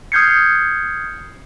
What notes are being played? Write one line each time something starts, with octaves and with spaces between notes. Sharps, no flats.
D#6 F6 G6 G#6 C7 C#7